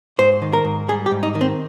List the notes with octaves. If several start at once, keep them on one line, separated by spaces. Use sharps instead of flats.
G#2 C5
D#3
A#4
G#2
G3 G#4
G4
G#2
D#4
D#3
C4